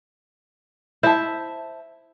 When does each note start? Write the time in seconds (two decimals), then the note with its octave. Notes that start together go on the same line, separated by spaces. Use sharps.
1.03 E4 C5 E5 A5